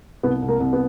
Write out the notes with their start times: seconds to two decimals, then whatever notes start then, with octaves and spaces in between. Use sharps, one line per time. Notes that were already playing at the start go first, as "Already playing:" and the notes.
0.23 C2 B3
0.42 C2
0.48 A#3
0.60 C2
0.73 B3